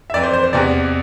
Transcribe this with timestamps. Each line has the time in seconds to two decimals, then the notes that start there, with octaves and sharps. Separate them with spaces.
0.10 E5
0.14 F2 E3 D5
0.23 C5
0.33 C5
0.44 C5
0.53 E2 C3 E3 D5